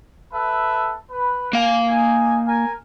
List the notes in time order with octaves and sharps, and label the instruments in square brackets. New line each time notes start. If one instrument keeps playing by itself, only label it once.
[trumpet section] A4 B4 E5
B4
[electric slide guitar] A#3 F5 [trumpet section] G#5
[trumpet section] D#4 G#5
A#4 G#5